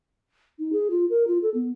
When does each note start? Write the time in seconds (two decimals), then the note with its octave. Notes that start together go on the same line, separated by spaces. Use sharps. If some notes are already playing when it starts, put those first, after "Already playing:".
0.59 D#4
0.73 G#4
0.90 F4
1.10 A#4
1.27 F4
1.42 A4
1.54 B3